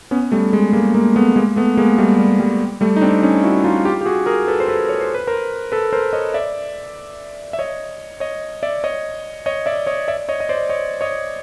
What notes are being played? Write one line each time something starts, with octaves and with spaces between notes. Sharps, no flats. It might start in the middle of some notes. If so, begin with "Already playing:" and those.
B3 C#4
G3 A3
G#3
G#3 A#3
G#3 A#3
A3 B3
G#3 A#3
A3 B3
G#3 A#3
G3 A3
G3
G3
G3 A3
D#4
C4 D4
C#4 D#4
E4 F#4
D#4 F4
F4 G4
G4
F#4 G#4
G#4 A#4
A4 B4
C5
A4 B4
C#5
C5
B4
A#4 C5
A4 B4
A#4 C5
C#5 D#5
D5 E5
E5
C#5 D#5
C#5 D#5
D5 E5
C#5 D#5
C#5 D#5
D5 E5
C#5 D#5
D5 E5
C#5 D#5
D#5
C5 D5
C#5 D#5
C#5 D#5